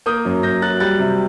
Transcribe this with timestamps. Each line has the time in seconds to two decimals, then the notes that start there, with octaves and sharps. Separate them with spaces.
0.06 A#3 D#6 G6
0.25 F#2
0.43 F#2 G6 A#6
0.62 F#3 F#6 A6
0.80 G3 F#6 A6
0.99 C3